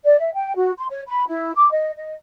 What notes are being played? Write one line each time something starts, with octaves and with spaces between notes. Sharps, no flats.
D5
E5
G5
F#4
C6
C#5
B5
E4
D6
D#5
D#5